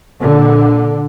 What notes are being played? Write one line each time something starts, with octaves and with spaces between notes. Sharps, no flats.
A#2 D3